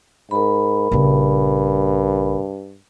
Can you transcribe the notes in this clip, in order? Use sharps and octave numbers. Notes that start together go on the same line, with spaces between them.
G#2 A#4 B5
A#1 G2 C#3